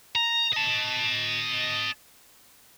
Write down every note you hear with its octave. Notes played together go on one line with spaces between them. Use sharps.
A#5
D#5 A5